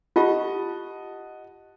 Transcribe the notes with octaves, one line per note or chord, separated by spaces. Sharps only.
F4 G4 D#5 F#5 A5